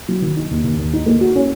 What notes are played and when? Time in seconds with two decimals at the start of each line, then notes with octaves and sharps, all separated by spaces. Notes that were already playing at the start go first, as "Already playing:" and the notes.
0.08 F#3
0.22 D#3
0.37 D#4
0.51 D#2
0.64 D#2
0.78 D#3
0.93 D#4
1.06 A#3
1.21 F#4
1.35 C#4